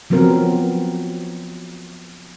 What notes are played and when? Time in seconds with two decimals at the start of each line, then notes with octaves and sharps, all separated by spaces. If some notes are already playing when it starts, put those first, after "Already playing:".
0.10 F3 F#3 B3 C4 A#4